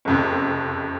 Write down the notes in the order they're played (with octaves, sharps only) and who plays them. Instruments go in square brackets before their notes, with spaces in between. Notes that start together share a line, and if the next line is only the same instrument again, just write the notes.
[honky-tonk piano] F#1 F2 C3